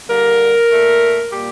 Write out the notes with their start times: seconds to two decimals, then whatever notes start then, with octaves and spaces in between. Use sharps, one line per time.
0.09 D3 G3 A#3 A#4
0.72 A#2 A3
1.33 A#2 G3 A#3 G4